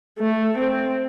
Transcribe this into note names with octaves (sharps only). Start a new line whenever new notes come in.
A3
C4